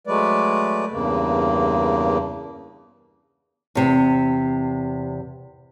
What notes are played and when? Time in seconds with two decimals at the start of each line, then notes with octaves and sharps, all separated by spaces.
0.07 F#3 G#3 A3 B4 D5
0.92 E2 G2 C#3 A#3
3.75 E2 C3